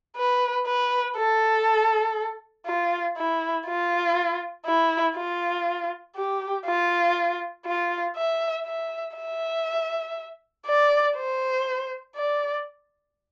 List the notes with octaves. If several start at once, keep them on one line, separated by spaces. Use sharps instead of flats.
B4
B4
A4
F4
E4
F4
E4
F4
G4
F4
F4
E5
E5
E5
D5
C5
D5